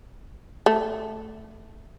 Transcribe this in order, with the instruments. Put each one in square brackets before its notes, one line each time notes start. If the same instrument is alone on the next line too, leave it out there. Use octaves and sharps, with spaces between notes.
[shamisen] A3